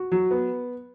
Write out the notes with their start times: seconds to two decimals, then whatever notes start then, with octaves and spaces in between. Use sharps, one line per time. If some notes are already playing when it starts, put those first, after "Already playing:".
Already playing: F#4
0.12 F#3
0.31 B3